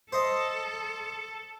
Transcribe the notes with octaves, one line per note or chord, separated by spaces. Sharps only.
A4 C5 D#5